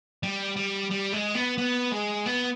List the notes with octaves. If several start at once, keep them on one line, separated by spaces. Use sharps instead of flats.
G3
G3
G3
G#3
B3
B3
G#3
B3